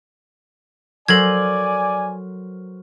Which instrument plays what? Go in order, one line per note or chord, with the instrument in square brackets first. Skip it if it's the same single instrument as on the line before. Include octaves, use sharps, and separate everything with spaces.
[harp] F#3 A#4 C5 [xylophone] A4 G#6 [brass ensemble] D5 G#5